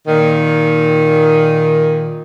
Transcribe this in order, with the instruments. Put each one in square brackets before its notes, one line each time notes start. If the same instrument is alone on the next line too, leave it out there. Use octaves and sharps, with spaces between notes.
[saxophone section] A#2 D#3